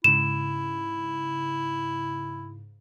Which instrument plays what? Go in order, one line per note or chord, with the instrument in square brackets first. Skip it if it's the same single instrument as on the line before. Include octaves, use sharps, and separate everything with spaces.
[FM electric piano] G#2 C#3 [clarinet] E4 [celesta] E7